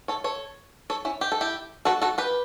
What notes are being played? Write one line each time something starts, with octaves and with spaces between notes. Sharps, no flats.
A4 C#5
A4 C#5
A4 C#5
C#4 E4
G4
A4
E4 G4
F#4 A4
F#4 A4
G4 B4